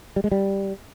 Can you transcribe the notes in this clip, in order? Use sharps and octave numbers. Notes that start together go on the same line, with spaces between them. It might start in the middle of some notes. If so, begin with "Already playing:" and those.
G3
G#3
G3